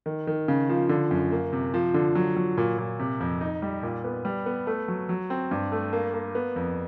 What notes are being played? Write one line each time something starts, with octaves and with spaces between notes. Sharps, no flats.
D#3
D#3
C#3
F3
D3
F#2
A#3
C3
F3
D3
F#3
F#3
A#2
A#2
C3
F2
D#4
G3
A#2
B3
G3
B3
A3
F#3
F#3
C4
G2
A3
A#3
A#3
B3
F2